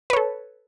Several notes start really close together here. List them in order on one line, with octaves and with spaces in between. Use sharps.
B4 C#5 A4